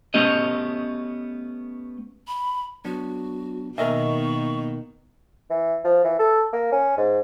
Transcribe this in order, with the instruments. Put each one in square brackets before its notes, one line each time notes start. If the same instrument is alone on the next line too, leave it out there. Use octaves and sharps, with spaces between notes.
[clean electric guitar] A3 B3 C#4 G4 D#5
[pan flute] B5
[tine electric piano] F#3 B3 D4 [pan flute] F#4
[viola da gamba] B2 D#3 B3 [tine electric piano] A#3 [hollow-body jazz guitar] A#4 D#5 E5 [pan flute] C#6
[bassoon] E3
F3
E3
A4
A#3
C#4
G#2